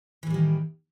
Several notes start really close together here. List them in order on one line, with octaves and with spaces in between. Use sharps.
E3 A2 G3 D#3